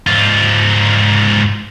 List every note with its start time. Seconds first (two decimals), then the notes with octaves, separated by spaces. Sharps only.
0.07 G#2 F4